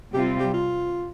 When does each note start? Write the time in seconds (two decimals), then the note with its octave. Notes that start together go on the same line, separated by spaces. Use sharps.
0.13 C3 G3 C4 F4 G4
0.40 G4
0.54 F4